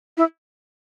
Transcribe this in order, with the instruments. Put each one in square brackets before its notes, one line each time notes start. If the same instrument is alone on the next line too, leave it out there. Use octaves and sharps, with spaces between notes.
[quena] E4